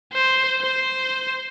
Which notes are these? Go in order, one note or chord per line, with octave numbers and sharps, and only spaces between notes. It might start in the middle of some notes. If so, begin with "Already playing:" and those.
C5
C5